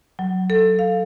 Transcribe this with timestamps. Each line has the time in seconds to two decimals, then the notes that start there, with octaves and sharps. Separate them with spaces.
0.19 F#3
0.50 A4
0.79 F5